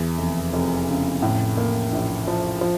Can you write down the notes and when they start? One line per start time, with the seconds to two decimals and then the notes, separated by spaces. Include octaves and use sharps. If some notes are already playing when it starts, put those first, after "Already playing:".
Already playing: E2
0.18 F1
0.53 F1
0.88 C#3
1.22 A2
1.57 A#3
1.93 A#1
2.27 F3
2.61 F3